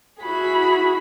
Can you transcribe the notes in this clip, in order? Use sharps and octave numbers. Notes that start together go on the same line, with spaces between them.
E4 F#4 G#4 B5